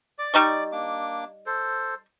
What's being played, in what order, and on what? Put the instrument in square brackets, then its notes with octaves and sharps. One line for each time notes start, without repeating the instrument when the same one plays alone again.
[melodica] D5 D6
[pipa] G3 D#4 C#6
[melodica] A#3 D4 D6
A4 C5